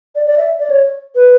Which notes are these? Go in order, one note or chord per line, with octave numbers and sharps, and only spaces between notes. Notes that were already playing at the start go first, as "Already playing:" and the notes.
D5
D5
E5
D5
C#5
B4